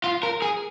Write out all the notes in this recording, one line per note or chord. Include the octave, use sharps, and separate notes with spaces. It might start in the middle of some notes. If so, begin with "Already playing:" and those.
F4
A#4
G#4